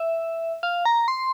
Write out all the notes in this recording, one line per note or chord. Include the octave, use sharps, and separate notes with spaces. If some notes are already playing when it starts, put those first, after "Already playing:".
Already playing: E5
F5
A#5
C6